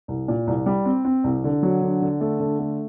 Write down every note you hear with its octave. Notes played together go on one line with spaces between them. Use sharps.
C2
A#2
C2
G3
C4
C4
C2
D3
F#3
D3
D3
A3
D3
A3